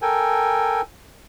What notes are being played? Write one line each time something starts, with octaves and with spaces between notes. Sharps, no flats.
A4 A#4 G5 G#5